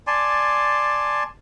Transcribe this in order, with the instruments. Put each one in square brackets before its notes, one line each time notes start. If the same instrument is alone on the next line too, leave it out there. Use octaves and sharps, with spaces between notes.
[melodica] D5 G#5 A5 C6